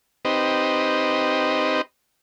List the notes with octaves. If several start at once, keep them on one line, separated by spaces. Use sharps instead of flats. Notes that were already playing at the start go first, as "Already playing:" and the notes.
C4 D#4 G4 B4 C5 D#5